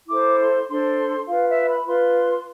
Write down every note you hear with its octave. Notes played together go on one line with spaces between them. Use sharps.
E4 A4 C5 D6
C6
D4 A4 C5 C6
F4 B4 F5
E5
B5
F4 B4 C6